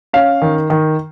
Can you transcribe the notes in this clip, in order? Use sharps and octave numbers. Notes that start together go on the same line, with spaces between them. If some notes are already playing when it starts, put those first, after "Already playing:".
C#4 F5
D#3
D#3